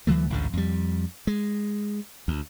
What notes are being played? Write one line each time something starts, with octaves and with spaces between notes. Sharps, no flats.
D2 E3 F#3 A3
A1 D2 G#2 D3
F2 G3
G#3
D2